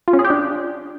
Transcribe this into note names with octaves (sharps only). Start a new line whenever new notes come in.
F4
C#4
G#4
G4
D4